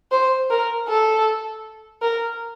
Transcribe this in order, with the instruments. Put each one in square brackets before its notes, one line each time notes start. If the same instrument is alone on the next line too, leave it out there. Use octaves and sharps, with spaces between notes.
[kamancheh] C5
A#4
A4
A#4